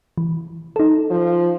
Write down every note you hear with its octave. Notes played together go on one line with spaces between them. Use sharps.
E3
D#4 A4
F3